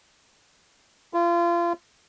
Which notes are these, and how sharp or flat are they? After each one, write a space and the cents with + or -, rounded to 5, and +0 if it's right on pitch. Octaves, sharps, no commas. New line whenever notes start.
F4 -30